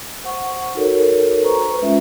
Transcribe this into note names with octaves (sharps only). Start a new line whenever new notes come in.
C5 F#5 C#6
D#4 F#4 A4 A#4 C#5
B4 C5 A#5 C#6
G#3 C#4 F4 E5